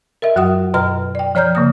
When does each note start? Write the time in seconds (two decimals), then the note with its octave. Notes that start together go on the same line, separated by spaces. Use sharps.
0.22 A#4 D#5 E5
0.36 F#2 F#3 F#4 F#5 D#6
0.74 F#2 B2 B4 D#5 A#5 F6
1.15 D5 G5
1.35 F3 C#5 D5 A#5 F6 G6
1.55 C#3 A#3 D#6